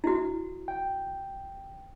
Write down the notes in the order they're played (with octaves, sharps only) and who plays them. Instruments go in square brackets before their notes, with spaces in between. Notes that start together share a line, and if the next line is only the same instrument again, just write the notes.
[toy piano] E4 F#4
[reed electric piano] G5